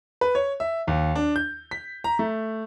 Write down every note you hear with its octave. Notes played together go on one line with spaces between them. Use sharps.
B4
C#5
E5
D#2
D4
G6
B6
A#5
A3